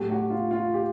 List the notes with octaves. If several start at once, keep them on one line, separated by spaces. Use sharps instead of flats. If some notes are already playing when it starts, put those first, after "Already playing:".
Already playing: A2 F#3 A3 G4
F#4
F4
F4
G4